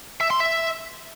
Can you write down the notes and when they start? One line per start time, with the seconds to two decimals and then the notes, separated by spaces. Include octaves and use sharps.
0.21 E5
0.30 C6
0.40 E5